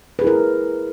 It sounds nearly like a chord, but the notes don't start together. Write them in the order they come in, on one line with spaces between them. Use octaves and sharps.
B4 G#4 E4 A#4